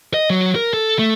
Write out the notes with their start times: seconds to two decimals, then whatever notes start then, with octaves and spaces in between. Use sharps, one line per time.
0.14 D#5
0.30 F#3
0.56 A#4
0.74 A4
0.99 A3